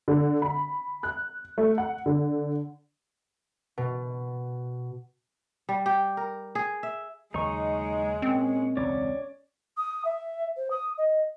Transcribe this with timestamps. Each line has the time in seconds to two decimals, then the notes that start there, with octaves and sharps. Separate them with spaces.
0.08 D3
0.42 B5
1.03 F#6
1.58 A3
1.78 F#5
2.06 D3
3.78 B2
5.69 G3
5.86 G4
6.17 A#4
6.55 G#4
6.83 E5
7.34 D#2 C#3 F#3 G#3 D#4 C#6
8.22 A#2 C4 C#4
8.77 E1 C#2 C#4 C#5 D5
9.77 D#6
10.05 E5
10.57 C5
10.70 D#6
10.98 D#5